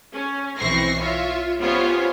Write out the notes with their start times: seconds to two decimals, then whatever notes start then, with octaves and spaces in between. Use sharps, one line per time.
0.14 C#4
0.58 B1 E3 C4 C#6 A#6 C7
0.98 F4 C#5 E5
1.60 B3 C#4 F4 G4 C5 C#5